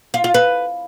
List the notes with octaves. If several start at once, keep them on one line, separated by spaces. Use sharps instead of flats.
F4
F4
B4